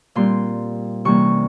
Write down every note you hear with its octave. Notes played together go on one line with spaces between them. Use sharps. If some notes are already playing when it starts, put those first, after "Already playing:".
A#2 G3 C4 C6
C3 E3 G3 A#3 C#4 C#6